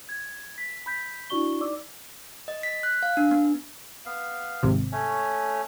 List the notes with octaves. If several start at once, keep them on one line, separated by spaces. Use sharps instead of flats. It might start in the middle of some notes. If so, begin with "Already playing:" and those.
G#6
B6
B5 G6 B6
D4 E4 F#4 D5 C#6 G7
D#4 D5 D6 E6
D#5
B6
F#6
F5
D4
B3
B3 F5
G#1 C3
A3 C#4 C#5